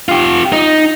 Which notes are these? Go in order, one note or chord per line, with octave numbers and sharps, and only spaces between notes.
F4 G4
D#4